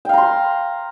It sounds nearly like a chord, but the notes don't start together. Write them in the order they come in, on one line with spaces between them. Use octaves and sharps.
G5 F5 A#5 C6